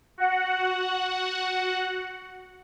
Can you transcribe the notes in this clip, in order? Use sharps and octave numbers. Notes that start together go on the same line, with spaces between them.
F#4 F#5